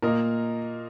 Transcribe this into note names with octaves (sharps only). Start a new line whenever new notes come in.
A#2 A#3 A#4 D#5